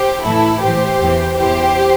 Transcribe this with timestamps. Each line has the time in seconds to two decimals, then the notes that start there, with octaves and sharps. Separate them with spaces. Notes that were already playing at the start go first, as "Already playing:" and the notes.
Already playing: G4 C5
0.24 A2 E3 E4 A4
0.63 A2 E3 G4 C5
1.02 E2 E3
1.39 E2 E3 G4 C5